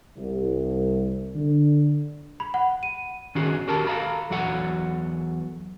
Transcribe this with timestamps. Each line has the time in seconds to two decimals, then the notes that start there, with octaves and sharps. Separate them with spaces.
0.16 C2
1.34 D3
2.40 B5
2.54 F#5
2.83 D#7
3.35 D#3 C#4 F#4 G#4
3.67 D#2 F#4 G4 A#4 A5
3.87 A4 F5 A#5 B5
4.30 E2 F#3 F#4 A4 F#5